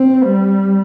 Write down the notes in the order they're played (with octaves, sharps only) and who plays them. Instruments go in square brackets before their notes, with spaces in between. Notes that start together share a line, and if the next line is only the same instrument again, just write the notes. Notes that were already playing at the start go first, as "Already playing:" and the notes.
Already playing: [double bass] C4
G3